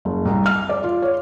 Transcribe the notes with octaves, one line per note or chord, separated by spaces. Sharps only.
F#1
C2
F6
D5
F4
C#5